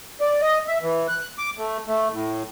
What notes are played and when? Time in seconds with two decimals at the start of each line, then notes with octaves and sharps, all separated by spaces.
0.21 D5
0.41 D#5
0.67 E5
0.82 E3
1.08 F#6
1.38 D6
1.58 A3
1.87 A3
2.13 A2